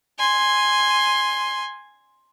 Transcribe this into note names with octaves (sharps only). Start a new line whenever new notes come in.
G#5 C6